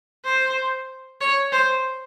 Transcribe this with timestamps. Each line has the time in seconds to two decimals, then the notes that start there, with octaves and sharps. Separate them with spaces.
0.25 C5
1.21 C#5
1.52 C5